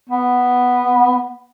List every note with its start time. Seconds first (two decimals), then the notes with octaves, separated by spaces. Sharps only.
0.10 B3